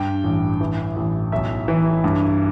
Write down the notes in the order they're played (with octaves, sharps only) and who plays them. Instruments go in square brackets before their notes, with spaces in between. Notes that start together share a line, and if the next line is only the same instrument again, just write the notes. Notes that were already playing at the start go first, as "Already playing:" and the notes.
Already playing: [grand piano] G2 G5
A1
E3
A1
B1 E5
E3
G2